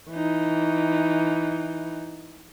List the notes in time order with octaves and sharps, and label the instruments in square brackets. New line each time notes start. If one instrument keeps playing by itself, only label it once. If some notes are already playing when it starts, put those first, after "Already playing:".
[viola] E3 D#4